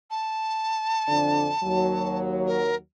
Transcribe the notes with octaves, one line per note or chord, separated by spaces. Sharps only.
A5
F2 D3 D4
D#2 F#3
A#4